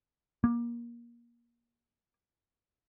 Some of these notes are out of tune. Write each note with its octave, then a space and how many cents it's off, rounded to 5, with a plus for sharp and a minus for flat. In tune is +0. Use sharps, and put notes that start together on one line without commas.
A#3 +25